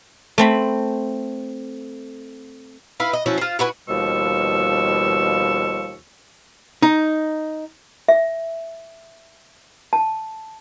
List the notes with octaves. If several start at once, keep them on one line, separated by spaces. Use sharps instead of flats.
A3 C4 B5
E4 B4 F5
D#5
F3 F#3 C#4 E4
F4 C5
E4 F#4 B4 G#5
D#2 B2 F3 G3 C#6 E6
D#4
E5
A5